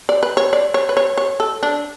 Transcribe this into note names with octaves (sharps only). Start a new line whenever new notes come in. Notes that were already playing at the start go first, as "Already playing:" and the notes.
D5
B4
C#5
D5
C#5
B4
C#5
C#5
A4
D4